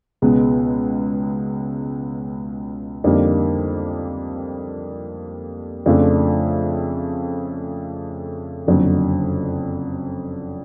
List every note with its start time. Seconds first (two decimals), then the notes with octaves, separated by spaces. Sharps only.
0.22 C#2 B2 G#3 B3
3.04 F2 D3 G3 A#3 D#4
5.86 F2 C#3 F3 A3 D4
8.67 F#1 F2 D3 F#3